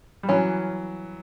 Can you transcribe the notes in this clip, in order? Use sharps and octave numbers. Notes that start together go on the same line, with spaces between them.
G3
E3 F#3 C#4